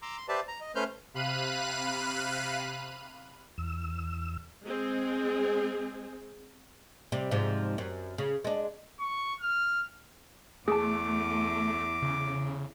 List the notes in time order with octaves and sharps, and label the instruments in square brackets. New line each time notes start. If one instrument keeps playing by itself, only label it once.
[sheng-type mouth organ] A#5 C6 D6 E6
C6
G4 B4 C5 D5 E5 A5
A#5
D#5
A3 C#4 B4 C5 F6 G6
[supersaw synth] C3 F5 B5 F#6 D#7
[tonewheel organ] E2 E6
[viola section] G#3 C4 G#4
[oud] C3 G3
G#2 C3 F3
F#2
C#3
G#3 D4
[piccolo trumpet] C#6
F6
[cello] E2 [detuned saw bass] A3 [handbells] G#4 A5 [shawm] D6
[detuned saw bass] C#3